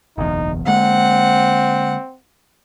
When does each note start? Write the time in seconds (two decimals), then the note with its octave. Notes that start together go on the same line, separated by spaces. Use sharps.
0.18 F#1 B1 E2 D#4
0.67 D3 G#3 A#3 C4 F#5